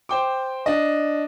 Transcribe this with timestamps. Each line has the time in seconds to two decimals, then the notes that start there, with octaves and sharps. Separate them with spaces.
0.09 C5 G5 D6
0.66 D4 D#5